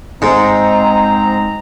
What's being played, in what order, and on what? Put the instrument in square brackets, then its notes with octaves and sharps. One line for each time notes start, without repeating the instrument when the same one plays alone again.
[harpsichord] G#2 [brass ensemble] C4 D#4 A#5